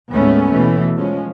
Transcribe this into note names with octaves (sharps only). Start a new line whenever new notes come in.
D#2 A2 G#3 A3 B3 C#4
B2 E3 A3 B3
F3 G#3 C#4